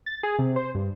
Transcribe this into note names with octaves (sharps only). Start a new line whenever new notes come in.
A6
G#4
C3
C5
G2